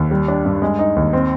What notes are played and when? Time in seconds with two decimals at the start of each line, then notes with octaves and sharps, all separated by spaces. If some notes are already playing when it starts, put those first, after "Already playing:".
Already playing: D#2
0.11 G3
0.28 D4
0.45 G2
0.62 G#3
0.79 D#4
0.96 D#2
1.13 C4